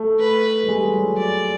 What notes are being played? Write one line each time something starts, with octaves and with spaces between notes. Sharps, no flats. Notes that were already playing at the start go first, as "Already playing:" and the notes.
Already playing: A3
B4
G3
G#3
F#3
D5